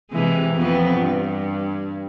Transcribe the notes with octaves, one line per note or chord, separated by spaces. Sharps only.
C3 E3 G#3
F2 B3 C4
G2